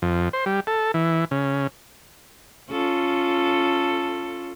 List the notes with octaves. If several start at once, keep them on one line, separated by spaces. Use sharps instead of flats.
F2
C5
G3
A4
E3
C#3
C#4 F4 A4